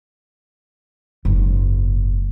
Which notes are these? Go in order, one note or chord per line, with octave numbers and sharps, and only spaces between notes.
F#1 G#2